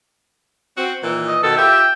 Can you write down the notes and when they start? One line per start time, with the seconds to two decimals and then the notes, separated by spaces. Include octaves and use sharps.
0.77 C4 F#4
1.03 A#2 D#3 E3
1.27 D#5
1.43 B2 D#3 A4
1.57 F4 G4 E5 G5